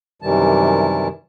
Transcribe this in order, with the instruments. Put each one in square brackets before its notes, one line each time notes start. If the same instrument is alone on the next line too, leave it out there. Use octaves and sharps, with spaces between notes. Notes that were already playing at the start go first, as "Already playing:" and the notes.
[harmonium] F#2 C3 D#3 E3 G3 A5